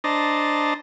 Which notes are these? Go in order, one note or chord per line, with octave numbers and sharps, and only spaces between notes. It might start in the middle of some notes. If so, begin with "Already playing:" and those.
D4 C5 D#5 A5 A#5